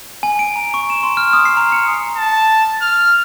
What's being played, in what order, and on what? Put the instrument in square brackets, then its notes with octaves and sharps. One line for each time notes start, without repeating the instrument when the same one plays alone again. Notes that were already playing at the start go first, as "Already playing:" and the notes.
[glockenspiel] G#5
D7
A#5
C#6
E7
C6
F6
D#6
C7
A#5
C#7
[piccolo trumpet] A5
F6